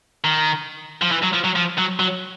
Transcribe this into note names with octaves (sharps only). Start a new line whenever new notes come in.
D#3
F3
E3
F#3
F3
F#3
F3
F#3
F#3